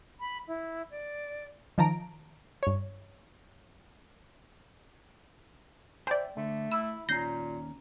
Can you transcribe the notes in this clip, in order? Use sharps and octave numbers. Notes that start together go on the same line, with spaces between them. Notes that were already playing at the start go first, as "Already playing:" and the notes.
B5
E4
D5
D#3 F3 A5 A#5 D7
G2 C#5
C5 D5 E5 G5
D3 A3
E4 E6
D#2 A#2 C#4 A#5 G6 A#6 C7